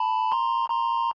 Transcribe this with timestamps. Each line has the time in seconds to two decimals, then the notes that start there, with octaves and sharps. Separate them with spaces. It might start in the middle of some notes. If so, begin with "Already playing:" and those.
Already playing: A5 B5
0.32 A#5 C6
0.70 A#5 C6